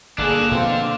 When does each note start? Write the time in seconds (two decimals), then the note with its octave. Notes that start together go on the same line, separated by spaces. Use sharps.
0.18 G1 B2 A#3 D4 G#4 A4 F#6
0.52 B2 D3 F3 C4 F4